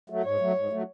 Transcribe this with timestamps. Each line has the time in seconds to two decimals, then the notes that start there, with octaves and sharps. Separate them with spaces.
0.10 F#3 A3
0.24 G#2 C#5
0.40 F#3 A3
0.55 G#2
0.70 F#3 A3